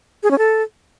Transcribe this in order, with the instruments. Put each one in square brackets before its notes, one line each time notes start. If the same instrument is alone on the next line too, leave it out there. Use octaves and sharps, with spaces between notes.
[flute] G#4
C#4
A4